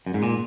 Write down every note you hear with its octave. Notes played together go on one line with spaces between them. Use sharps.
F#2
G#2
A#2